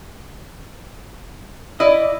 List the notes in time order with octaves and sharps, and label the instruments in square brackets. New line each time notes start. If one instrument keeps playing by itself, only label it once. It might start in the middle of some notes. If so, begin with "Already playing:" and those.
[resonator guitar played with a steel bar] E4 D5 [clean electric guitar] D#5